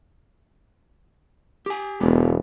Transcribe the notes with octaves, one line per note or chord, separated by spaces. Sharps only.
G4 G#5
E1 G#3 B3 G4